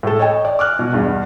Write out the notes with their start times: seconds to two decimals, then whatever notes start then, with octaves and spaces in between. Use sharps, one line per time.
0.03 A2 A4
0.19 C#5 D#5 G5
0.45 D5
0.59 D6 F6 F#6
0.79 B2
0.93 E2 G2